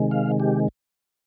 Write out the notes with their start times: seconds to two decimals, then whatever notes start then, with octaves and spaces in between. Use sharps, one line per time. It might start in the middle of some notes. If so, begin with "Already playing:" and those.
Already playing: C3 D#3 G#3
0.11 F5
0.40 G4